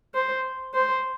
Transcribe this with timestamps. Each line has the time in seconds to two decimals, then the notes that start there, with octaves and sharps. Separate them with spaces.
0.14 C5
0.74 C5